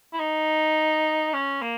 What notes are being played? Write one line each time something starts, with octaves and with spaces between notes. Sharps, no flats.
E4
D#4
C#4
A#3